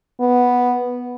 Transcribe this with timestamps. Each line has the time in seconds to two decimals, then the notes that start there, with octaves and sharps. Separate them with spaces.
0.21 B3